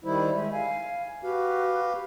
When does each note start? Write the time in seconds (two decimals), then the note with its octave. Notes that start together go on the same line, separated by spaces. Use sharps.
0.04 D#3 G3 E4 C5
0.35 G#3 E5
0.52 F5 G#5
1.23 F#4 G4 B4 F5